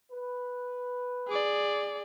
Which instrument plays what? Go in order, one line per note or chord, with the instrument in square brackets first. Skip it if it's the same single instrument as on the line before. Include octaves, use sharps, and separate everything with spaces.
[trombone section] B4
[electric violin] G#4 D5